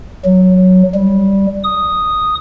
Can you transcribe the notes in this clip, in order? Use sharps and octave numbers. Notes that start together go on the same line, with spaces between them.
F#3
G3
D#6